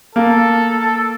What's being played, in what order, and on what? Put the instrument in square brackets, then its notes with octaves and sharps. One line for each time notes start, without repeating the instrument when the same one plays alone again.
[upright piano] A#3 [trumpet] A4